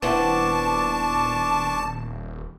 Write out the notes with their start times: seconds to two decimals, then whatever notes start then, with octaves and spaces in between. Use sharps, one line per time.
0.02 D#1 B3 C4 D4 E4 A5 C#6 D6